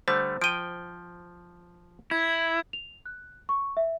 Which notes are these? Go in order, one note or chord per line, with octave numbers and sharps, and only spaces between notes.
D3 G3 A3 C5
F3 G5 D7 D#7
E4 G#6
F7
F#6
C#6
E5